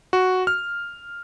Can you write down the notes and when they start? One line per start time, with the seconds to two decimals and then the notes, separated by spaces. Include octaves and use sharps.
0.13 F#4
0.47 F6